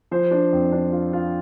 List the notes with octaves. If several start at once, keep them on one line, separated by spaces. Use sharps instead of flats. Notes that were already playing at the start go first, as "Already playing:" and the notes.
F3 C5
D4
F2
D4
F4
F4